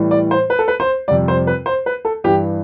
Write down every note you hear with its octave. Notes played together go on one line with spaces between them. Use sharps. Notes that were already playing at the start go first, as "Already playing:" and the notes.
Already playing: A2 E3 G3
D5
C5
B4
A4
B4
C5
F2 C3 G3 D5
C5
B4
C5
B4
A4
G2 E3 G3 G4